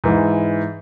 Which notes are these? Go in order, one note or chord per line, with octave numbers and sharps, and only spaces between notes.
G#2 E3